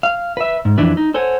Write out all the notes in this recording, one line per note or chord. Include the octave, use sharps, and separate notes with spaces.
F5
B4 E5
G#2
F2 E3 D4 E4 B4
D#4
A4 C5 C#5 F#5 G#5